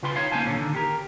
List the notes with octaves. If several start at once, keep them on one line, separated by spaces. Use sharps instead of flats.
C#3 F4 B4 G5 C6
D#4 C#5 F5
A#3 C#4 C5 F5 G#5 A5
D#2 A#2 D3 C#4
D3 D#3
G4 A#4